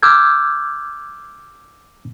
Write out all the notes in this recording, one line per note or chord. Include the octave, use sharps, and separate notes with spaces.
D6 E6 F6 G6 G#6